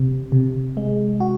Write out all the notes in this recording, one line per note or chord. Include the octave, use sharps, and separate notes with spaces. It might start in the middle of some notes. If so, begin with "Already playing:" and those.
Already playing: C3
C3
G#3
F#4